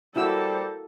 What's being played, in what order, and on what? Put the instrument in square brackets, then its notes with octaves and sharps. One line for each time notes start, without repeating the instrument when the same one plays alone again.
[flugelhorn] G3 [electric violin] A#3 A4 [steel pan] E4 F#4 E6 [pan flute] C5